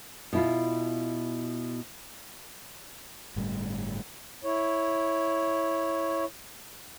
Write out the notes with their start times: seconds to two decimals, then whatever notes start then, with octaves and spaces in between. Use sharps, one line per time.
0.33 B2 E4 F4
3.36 G1 A2 G3
4.44 E4 C#5